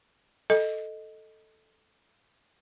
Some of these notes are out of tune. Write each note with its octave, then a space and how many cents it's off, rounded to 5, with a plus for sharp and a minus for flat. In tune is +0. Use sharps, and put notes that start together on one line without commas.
A4 +0 D#5 +0